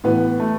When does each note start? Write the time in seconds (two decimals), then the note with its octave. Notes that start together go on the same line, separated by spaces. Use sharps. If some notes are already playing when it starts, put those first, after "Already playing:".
0.04 A2 E3 B3
0.40 A3